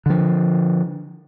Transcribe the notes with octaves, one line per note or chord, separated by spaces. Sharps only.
D3 F3